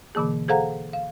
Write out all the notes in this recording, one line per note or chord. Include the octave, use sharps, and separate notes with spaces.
B2 D3 E3 A#3 G#4
G#4 A4 C5 F5 F#5 A#5
F5